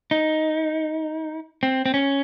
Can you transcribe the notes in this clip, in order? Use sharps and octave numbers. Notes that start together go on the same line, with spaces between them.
D#4
C4
C4
C#4